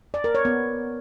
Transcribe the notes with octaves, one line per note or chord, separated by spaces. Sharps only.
D5
A#4
C#5
B3